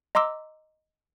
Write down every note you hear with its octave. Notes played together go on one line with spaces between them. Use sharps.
D#5 A#5 C6 D6 E6